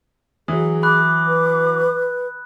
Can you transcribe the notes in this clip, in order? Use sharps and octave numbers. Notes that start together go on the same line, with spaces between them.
E3 F#3 G#4 D#6
B5 D6 D#6 F#6
B4